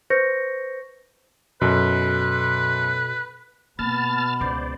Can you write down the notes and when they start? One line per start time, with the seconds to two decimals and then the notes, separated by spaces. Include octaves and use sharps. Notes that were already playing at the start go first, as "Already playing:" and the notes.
0.10 B4 C5 C#6 G6 A#6 C#7
1.62 F#2 B2 A4 B4
3.79 B2 A#3 B3 A5 B5 F6 A6
4.41 C#2 C5 D5